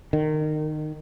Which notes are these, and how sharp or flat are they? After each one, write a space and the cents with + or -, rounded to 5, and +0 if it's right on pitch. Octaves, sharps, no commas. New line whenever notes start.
D#3 -20